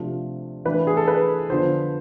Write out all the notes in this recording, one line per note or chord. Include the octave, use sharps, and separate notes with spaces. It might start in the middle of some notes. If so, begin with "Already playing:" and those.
Already playing: C3 F3 A3 D4
E3 A3 D4 B4
G#4
A4
B4
D3 F3 B3 D4 C5